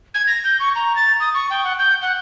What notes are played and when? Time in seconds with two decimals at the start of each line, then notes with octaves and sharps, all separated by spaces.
0.14 G#6
0.27 A#6
0.44 G6
0.60 C#6
0.76 A#5
0.96 A6
1.20 D#6
1.35 C#6
1.50 G5
1.64 F#5
1.79 G6
2.02 F#5